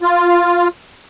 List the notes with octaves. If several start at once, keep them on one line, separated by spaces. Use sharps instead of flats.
F4